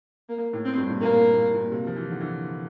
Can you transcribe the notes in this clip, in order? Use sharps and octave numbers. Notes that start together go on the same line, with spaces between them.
A#3
A2
C4
G2
A#2
A2 A#3
G2
A2
A#2
C3
F3
E3
D3
E3